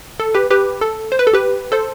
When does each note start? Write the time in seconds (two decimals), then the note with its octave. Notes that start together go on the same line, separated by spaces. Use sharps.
0.20 A4
0.34 G4 B4
0.51 G4 B4
0.81 A4
1.12 C5
1.19 B4
1.27 A4
1.33 G4 B4
1.72 A4 C5